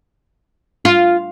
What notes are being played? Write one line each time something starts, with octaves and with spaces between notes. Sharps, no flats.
F4